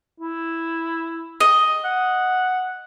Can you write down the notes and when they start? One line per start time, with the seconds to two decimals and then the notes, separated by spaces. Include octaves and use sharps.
0.20 E4
1.41 D#5
1.85 F#5